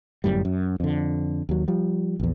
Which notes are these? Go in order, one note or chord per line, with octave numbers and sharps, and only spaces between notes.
G1 F#2 A2 G3
F#2
F2 D3
D#2 F#3
F3 G3
A#1 E2